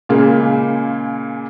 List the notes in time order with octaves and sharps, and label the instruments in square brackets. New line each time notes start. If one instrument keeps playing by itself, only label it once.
[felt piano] A#2 C#3 G#3 A#3